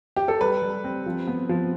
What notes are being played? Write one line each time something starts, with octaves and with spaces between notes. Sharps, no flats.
G4
A4
G3 B4
G3
C4
F3
B3
F3